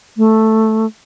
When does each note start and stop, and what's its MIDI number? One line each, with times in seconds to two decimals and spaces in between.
0.17 0.86 57